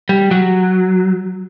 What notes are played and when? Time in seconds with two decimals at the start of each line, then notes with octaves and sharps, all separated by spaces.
0.09 G3
0.31 F#3